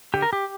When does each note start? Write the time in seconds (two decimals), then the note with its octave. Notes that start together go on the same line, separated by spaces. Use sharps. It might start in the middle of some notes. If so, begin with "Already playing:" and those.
0.14 D3 G4
0.22 A#4
0.33 G4